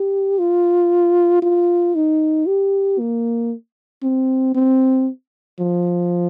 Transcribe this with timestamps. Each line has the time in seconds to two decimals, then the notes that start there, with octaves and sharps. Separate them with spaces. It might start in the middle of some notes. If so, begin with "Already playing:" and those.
Already playing: G4
0.39 F4
1.42 F4
1.95 D#4
2.47 G4
2.99 A#3
4.03 C4
4.55 C4
5.59 F3